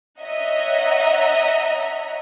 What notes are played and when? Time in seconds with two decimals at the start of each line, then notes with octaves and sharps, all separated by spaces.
0.21 C#5 D#5 E5 F#5 A#5